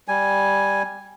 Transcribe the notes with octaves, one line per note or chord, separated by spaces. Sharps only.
G3 G#5